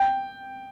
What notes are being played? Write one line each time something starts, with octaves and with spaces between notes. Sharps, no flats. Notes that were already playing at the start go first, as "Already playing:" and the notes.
Already playing: G5